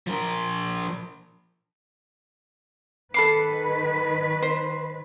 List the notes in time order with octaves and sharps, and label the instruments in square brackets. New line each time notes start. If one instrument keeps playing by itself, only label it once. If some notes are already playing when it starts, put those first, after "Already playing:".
[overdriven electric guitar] F3 A#4
[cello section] D#3 B4 [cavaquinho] A4 B5 D6 [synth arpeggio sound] C7
[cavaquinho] C5